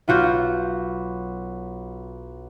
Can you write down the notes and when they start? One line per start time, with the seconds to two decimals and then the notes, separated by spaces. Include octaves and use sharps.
0.08 B1 F4 F#4 G6